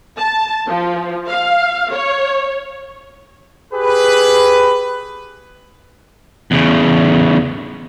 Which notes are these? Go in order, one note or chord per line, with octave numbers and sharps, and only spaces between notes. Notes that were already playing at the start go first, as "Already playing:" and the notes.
A5
F3
F5
C#5
G4 G#4 B4
E2 C#3